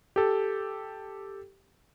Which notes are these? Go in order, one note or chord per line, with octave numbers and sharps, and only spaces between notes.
G4 A4